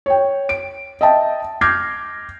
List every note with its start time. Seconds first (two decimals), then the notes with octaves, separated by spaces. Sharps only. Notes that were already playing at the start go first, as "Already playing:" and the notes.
0.06 C#5 G5
0.49 D7
1.01 D#5 E5 G5 A5
1.61 D6 F6 G6 G#6 A#6 C7